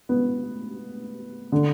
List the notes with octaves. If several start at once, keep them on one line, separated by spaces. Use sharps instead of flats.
B3
D3